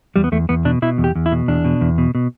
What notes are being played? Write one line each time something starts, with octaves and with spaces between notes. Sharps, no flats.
E2 G3
B3
E2 A3
E2 B3
B2 D4
B2 E4
E2
G4
E2
E4
B2
E2 D4
B2
E2
B2
B2